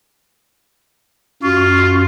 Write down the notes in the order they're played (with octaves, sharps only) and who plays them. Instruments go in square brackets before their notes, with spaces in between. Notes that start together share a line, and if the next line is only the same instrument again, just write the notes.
[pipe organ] F#2 F#4 [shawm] F4